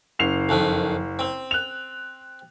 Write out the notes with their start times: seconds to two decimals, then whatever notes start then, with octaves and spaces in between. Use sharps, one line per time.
0.19 F#1 C7 F7
0.49 F2 D#3
1.19 C4
1.51 F#6 F7